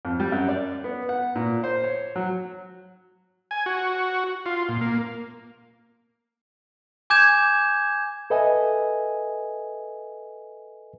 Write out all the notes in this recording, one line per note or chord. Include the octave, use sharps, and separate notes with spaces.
F2
G3
F#2
D5
B3
F#5
A#2
C5
C#5
F#3
G#5
F#4
F4
A#2
A#3
G#5 D6 G6 G#6 E7
A4 B4 D#5 E5 G#5